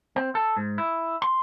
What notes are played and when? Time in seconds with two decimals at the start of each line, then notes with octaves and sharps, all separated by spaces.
0.16 C4
0.35 A4
0.57 G#2
0.78 E4
1.22 C6